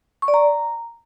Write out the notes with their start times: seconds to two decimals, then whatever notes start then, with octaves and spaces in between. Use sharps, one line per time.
0.22 C#6
0.28 D5
0.34 A#5